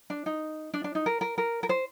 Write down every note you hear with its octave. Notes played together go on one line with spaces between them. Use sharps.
D4
D#4
D4
D4
D#4
A#4
A#4
A#4
A#4
C5